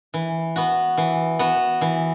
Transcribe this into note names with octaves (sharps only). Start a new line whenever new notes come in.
E3
B3 F#4
E3
B3 F#4
E3